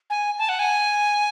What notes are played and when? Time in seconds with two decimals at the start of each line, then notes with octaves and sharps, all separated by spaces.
0.10 G#5
0.39 A5
0.49 F#5
0.59 G#5